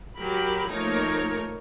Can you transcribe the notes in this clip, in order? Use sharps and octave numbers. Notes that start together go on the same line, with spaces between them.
F#3 G4 A#4 B5
F3 A3 A#3 D#4 A#4 C#5